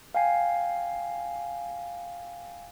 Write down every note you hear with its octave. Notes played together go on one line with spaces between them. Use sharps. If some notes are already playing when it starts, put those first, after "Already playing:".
F5 G5 G#5 C7